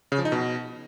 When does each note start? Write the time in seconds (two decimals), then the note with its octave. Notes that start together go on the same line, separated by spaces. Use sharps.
0.12 C#3
0.18 F3
0.25 D#4
0.32 B2